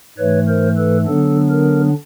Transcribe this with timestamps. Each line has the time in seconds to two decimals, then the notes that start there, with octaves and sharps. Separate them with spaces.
0.18 G#2 E3 A3 B4 C#5
0.48 A#4 C5
0.77 A4 B4
1.06 D3 F#3 B3 D4 A4
1.50 A#4